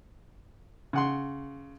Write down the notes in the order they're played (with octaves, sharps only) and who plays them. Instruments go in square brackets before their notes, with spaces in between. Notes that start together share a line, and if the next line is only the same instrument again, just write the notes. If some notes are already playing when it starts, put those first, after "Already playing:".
[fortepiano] C#3 F#5 C6